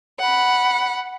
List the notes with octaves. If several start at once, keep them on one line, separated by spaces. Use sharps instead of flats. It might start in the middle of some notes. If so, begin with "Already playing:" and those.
F#5 B5